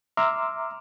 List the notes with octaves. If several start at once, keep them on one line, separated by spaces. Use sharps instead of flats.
E5 A#5 C6 D6 E6 F6